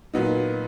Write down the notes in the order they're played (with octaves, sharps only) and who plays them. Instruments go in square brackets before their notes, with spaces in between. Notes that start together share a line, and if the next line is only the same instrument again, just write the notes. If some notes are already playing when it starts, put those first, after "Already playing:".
[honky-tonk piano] A#2 F#3 B3 D#4